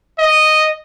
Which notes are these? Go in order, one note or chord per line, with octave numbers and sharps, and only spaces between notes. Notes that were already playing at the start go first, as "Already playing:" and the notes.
D#5